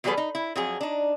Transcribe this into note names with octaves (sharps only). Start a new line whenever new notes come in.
E2 F#3 G3 G#4 A4 B4
D#4
E4
F2 F#3 G#4
D4 D#4